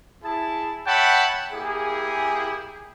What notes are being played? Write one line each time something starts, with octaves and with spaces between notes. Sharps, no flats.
E4 G#4 A5
C#5 E5 F#5 G5 A5 B5
A#3 E4 G4 G#4